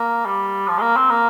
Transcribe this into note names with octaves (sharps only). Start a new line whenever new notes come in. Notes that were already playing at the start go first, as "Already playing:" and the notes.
Already playing: A#3
G3
F3
G#3
A#3
C4
A#3